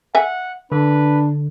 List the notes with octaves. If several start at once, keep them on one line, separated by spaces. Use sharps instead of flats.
E5 F#5 G#5
D3 D4 B4